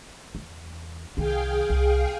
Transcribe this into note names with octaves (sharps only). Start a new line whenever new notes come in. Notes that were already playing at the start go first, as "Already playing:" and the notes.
E2
C2 D#3 G#4 F5 G5
C2